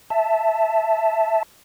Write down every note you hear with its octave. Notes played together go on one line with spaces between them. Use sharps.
E5 A5